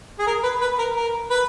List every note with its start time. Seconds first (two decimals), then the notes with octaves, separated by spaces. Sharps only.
0.19 G#4
0.26 A#4
0.43 B4
0.61 B4
0.78 A#4
0.96 A#4
1.30 B4